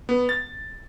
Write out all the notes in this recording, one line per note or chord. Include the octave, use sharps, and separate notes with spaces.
B3
A6